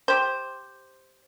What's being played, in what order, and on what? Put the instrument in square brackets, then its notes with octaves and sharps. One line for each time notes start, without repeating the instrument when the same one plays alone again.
[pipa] G4 C5